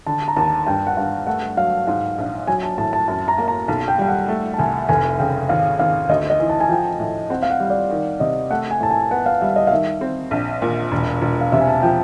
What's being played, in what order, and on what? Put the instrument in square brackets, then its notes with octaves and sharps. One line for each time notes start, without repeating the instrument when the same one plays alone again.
[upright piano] D3 [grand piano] A5
[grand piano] A#5
[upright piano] D#2 [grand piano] A5
[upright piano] G2 [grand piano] G5
[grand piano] F#5
[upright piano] G2 [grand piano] F5
[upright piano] A3 [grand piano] F#5
[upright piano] F#3 [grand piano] F5
[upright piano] G#2 [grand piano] F5
[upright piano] A#1
[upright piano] F#3 [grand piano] G#5
[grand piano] A5
[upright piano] A2 [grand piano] A5
[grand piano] A5
[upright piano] F#2 [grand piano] A5
[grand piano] A#5
[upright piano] A#3
[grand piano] A#5
[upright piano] B1 [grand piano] A5
[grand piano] G5
[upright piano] G3 [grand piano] G5
[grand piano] F#5
[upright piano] A3
[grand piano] A5
[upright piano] C2 [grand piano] G#5
[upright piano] F1 [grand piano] G#5
[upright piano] C#3 [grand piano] G5
[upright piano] G#1 [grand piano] F5
[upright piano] G#1 [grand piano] F5
[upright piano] D2 [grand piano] D#5
[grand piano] D#5
[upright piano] E3
[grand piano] A5
G#5
[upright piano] F3 [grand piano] G5
[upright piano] A2
[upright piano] C4 [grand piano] F#5
[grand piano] F5
F#5
[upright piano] G3
[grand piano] D5
[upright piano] D#3
[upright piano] C3 [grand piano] D#5
[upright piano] A3 [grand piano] F#5
[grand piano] G#5
[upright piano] A2 [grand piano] A5
[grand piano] G#5
[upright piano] B3 [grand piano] F#5
[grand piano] F5
[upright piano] G3 [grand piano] E5
[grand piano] D#5
F5
[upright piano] D#3 [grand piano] E5
[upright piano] C4
A#1
A#2
E1
E1
[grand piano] F5
[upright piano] C3 [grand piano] E5
[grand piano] G#5
A5
[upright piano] F3 [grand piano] G5